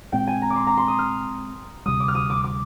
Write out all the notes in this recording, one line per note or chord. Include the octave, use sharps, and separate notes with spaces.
A#2 G#3 C4 G5
G#5
A#5
D6
C6
A#5
C6
D#6
F6
D2 C3 G3 D#6
D6
F6
D#6
D6
D6